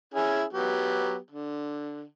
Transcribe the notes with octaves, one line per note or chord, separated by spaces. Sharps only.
C#4 E4 G#4
F#3 B3 G4
D3